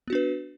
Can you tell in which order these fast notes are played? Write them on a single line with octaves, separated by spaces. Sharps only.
B3 F#4 D4 B4